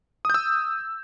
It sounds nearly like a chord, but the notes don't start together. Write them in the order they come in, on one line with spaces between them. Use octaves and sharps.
D#6 G6 E6